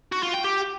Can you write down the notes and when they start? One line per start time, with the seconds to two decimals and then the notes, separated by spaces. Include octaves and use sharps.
0.12 F#4
0.23 F4
0.34 G5
0.44 G4